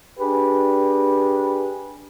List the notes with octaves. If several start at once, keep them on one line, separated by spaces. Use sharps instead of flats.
D4 G4 G#4 B4